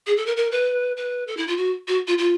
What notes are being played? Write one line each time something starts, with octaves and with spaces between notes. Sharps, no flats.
G#4
A4
A#4
A#4
B4
B4
A4
E4
F4
F#4
F#4
F4
F4